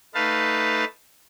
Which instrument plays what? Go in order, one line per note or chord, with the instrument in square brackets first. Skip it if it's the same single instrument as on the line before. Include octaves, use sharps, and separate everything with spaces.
[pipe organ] A3 D#4 B4 F5 A5